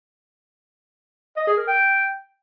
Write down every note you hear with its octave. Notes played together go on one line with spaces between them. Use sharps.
D#5
G#4
A#4
G5